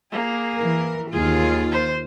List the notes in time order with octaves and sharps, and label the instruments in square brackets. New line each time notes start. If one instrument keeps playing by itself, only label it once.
[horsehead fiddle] A#3 G#4
[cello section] E3 A#4
[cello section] D#2 F4 [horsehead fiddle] G#4
[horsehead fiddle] C5